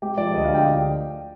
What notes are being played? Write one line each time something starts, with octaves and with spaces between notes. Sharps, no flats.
G#3 G4
F3 D5
D2 D#5
F5
D3
G5